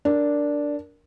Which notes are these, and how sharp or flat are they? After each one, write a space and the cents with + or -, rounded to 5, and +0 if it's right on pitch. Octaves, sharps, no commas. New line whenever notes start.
D4 -5 A#4 +0